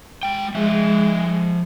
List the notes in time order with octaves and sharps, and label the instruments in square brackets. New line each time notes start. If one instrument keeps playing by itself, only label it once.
[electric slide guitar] G#3 G5
[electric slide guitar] F3 E5 [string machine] G#3